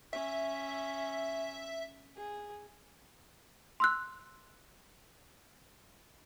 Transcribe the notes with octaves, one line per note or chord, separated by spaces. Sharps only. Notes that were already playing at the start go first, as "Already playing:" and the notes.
C#4 E5
G#4
C6 E6 F#6